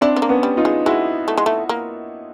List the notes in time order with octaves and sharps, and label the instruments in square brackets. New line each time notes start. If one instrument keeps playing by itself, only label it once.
[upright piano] C4 D4 [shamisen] E4
[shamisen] B3
A#3
[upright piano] B3 C#4
[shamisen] G3
[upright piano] D#4 F4
[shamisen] G#3
[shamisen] G#3 [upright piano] E4 F#4
[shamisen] A3
G#3
A3
A#3